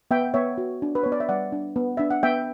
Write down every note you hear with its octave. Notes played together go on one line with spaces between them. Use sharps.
B3 E5 G5
B3 C#5 E5
F#4
D4
B4
B3 C#5
D5
E5
G3 D5 F#5
D4
B3
D4 E5
F#5
B3 E5 G5